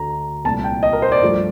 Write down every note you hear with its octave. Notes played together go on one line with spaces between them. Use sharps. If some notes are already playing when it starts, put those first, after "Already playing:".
Already playing: D2 D3 A3 A#5
C2 A#2 A3 A5
G5
D#5
A#4
C5
D5
G2 F3 A3